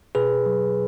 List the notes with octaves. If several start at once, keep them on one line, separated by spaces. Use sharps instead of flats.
B2 G#4 B4
F#3